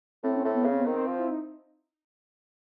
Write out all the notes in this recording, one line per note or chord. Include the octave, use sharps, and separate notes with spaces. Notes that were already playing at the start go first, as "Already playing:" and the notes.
A2 C4
C#4
C4
A2
B3
C#3
C4
B3
D#3 C4
F3
E4
D#4